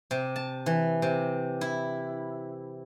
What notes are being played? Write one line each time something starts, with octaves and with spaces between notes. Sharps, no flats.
C3
A5
E3
C3
E4